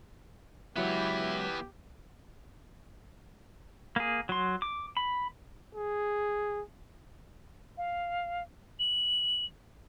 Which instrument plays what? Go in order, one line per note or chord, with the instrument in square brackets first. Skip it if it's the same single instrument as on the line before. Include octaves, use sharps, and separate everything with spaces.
[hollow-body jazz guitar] C#2 F#3 [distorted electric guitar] E3 B3 [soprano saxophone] E4 [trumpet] G4
[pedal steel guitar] A#3 G#4
F#3 C6
D6
B5
[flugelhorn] G#4
[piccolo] F5
F#7